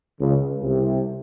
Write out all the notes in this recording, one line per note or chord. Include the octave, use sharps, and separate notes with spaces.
C#2 C#3
C2 C3